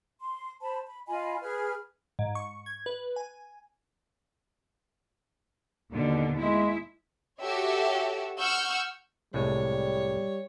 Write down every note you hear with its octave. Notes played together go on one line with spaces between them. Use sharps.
C6
C5 A5 B5
B5
F4 D#5 G#5 B5
G#4 B4 F6
G#2
C#6
G#6
B4
G#5
D#2 B2 D3
G#3 E4
F#4 G4 A4 C#5 E5
F#5 C#6 E6 F6 G6
C2 A2 G3 G#3 C#5